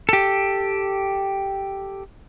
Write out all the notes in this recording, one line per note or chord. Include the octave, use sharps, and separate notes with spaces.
G4 A4